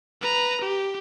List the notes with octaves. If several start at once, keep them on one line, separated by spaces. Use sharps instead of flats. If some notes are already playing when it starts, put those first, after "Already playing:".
B4 A#5
G4